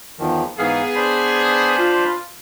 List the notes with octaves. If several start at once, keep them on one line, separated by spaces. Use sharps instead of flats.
E2 D#3 F3
G#2 E3 B3 G#4 F5
D4 C5 B5
F4